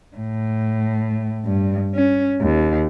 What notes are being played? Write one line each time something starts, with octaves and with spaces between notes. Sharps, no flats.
A2
G2
C#4
D#2